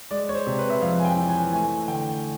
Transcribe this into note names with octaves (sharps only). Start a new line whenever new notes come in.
G#3 D5
C#5
C5
C3
B4
E5
F2 F5
G#5
G5
E3
G#5
A3 G#5
D3 G5